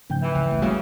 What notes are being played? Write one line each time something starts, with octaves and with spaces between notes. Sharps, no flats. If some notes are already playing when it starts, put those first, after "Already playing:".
G#2 C#3 F3 A3 G5 G6
E3
C#2
D1 G#1 A3
C#3 G3 G#3 A#3 F#4